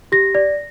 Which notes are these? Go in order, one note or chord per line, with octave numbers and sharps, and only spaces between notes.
G4 A#6
D5